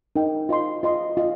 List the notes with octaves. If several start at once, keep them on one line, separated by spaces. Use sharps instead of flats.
D#4 A#4 G5
F4 D#5 C6
F4 D#5 C6
F4 D#5